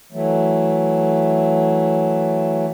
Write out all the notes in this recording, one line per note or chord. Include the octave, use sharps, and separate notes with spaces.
E3 F#3 A3